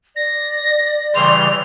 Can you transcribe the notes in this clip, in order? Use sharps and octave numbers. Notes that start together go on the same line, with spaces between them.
D5 A#6
C#3 E3 G3 C6 F7